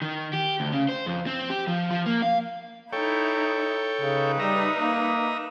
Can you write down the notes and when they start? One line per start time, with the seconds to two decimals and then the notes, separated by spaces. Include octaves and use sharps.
0.02 D#3
0.33 G4
0.60 D2
0.72 C#3
0.89 C5
1.06 F2
1.27 C4
1.50 G4
1.68 F3
1.91 F3
2.06 A#3
2.22 F5
2.93 D#4 E4 A4 C#5 G5
4.01 C#3 D#4 B4
4.40 G3 D#5 E5 A#5
4.78 A#3